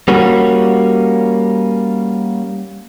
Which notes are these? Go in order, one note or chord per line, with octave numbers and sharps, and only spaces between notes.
G3 A#3 C#4 F#4